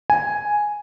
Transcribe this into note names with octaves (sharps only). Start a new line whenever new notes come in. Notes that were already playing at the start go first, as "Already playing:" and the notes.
G#5